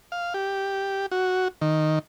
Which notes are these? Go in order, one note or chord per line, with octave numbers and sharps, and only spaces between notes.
F5
G4
F#4
D#3